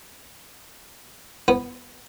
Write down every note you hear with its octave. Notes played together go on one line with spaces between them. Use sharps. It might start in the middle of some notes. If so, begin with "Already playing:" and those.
B3